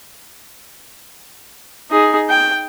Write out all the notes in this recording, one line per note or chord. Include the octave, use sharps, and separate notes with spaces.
D#4 G#4
G5